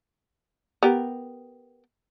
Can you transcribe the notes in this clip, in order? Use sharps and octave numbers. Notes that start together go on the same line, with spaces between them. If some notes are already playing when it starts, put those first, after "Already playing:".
B3 G4 A#4